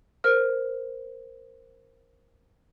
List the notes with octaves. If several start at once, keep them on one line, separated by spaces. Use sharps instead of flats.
A#4 C5 F6